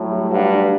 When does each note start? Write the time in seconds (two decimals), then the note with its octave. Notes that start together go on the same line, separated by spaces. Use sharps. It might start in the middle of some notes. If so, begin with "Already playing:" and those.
Already playing: A2 F#3 A3
0.11 G3
0.31 G2 F#4
0.50 D4